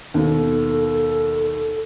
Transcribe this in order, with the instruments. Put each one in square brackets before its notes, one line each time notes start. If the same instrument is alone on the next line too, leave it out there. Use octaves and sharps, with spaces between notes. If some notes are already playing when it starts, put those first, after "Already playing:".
[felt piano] D#2 B2 [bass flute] A4